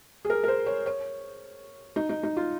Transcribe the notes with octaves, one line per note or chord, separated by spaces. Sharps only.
G#4
A#4
A#4
C5
C#5
C#5
D#4
D#4
D#4
F4